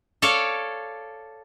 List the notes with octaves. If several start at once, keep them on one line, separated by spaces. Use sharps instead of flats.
A4 C#5 D5 F5